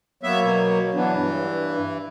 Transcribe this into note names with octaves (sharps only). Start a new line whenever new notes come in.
F#3 A#3 B3 C#5 E5
B2
E3 F#3 B3 D4
G2